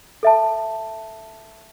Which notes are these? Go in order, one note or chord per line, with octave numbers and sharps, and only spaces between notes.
A4 E5 A5